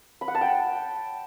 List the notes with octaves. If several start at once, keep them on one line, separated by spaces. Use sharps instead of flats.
B5
F#5
A5
G5